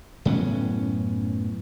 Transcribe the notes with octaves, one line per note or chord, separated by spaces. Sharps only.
F#2 A2 B3 C#4